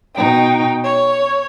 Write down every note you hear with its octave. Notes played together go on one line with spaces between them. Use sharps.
B2 D#4 G5
C#5